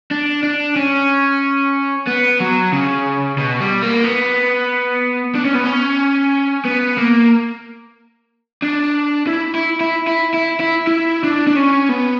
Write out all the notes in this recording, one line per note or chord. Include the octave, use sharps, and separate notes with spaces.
D4
D4
C#4
B3
F#3
C#3
B2
G3
A#3
B3
D4
C#4
B3
C#4
B3
A#3
D4
E4
E4
E4
E4
E4
E4
E4
D4
D4
C#4
B3